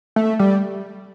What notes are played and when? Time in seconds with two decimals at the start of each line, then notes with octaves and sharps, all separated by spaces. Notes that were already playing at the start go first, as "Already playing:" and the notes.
0.16 A3
0.39 G3